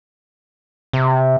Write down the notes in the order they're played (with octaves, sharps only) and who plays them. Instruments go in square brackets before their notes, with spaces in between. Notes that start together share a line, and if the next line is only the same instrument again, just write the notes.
[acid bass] C3